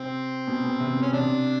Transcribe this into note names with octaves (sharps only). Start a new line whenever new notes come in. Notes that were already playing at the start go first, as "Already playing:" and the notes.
Already playing: C3 C4
B2
B2
C3
B2
C#4
C3 D4